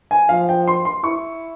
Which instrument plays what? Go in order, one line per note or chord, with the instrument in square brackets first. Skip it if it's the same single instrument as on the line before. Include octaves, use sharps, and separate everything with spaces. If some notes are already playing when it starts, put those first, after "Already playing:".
[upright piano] G#5
[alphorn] F3 [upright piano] F5
[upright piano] G5
C6
C6
[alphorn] E4 [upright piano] C#6